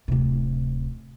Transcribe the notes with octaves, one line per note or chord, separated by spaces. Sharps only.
D1 C3